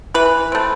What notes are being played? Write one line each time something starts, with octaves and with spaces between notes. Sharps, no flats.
E3 B4
A3 C4